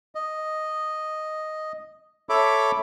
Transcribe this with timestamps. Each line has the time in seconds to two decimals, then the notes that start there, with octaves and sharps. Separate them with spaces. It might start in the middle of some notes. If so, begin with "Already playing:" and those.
0.15 D#5
2.29 A4 C#5 E5 B5 D6